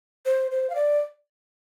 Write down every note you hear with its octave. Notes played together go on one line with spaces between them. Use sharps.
C5
C5
F5
D5